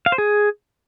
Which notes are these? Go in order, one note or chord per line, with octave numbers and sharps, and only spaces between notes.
F5
C5
G#4